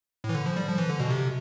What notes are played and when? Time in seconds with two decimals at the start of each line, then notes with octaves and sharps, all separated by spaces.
0.24 A2
0.29 E3
0.35 D3
0.46 F3
0.56 G3
0.68 F3
0.78 E3
0.90 D3
0.99 B2
1.11 C3